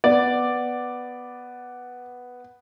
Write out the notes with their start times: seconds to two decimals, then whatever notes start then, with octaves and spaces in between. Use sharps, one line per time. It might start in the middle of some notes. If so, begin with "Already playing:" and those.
0.04 B3 D5